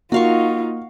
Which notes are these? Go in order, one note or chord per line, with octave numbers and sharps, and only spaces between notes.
A#3 D#4 F4 F#4 F5 C#6